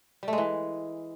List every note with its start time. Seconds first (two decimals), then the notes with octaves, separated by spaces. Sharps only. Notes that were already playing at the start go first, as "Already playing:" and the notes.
0.23 G3
0.28 A3
0.33 G#3
0.38 E3